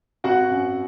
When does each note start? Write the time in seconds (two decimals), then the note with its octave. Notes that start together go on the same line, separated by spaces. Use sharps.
0.24 G#1 F#4 F#5
0.49 F#2